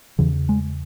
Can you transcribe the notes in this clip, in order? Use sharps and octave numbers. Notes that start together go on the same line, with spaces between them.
E2 C#3 E3
G#3